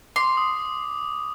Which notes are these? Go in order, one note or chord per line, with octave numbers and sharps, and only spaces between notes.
C6 D6
D#6